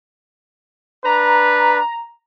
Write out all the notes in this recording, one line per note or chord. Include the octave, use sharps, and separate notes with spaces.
D4 B4 A#5